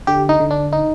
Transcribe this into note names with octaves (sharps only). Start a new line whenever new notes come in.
D3 G4
D#4
D3
D4
D#4